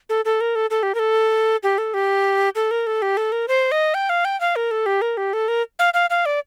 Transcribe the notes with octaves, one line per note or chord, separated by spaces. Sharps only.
A4
A4
A#4
A4
A4
G4
A#4
A4
G4
A4
G4
A4
A#4
A4
G4
A4
A#4
C5
D#5
G5
F5
G5
F5
A#4
A4
G4
A#4
G4
A4
A#4
F5
F5
F5
D5